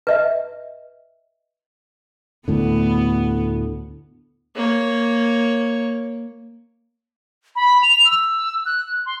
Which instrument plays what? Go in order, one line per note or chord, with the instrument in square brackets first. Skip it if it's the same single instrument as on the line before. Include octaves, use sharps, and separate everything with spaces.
[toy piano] B4 D#5 E5
[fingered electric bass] D2 A2 D3 [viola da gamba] B3
[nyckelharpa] A#3 C#5
[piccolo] B5
F7
E6
F#6
C6